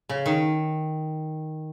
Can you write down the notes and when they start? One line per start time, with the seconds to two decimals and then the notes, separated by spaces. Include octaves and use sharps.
0.09 C#3
0.26 D#3